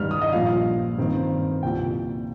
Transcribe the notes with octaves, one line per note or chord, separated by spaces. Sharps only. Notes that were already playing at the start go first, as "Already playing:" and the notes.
Already playing: G2 D#3 G3 D#4 F6
D#6
D#5
A#1 A#2 F3 F5
G2 D#3 C4
C2 A#2 F3 G5